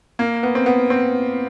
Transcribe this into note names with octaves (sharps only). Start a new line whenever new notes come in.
A#3
B3
C4
B3
C4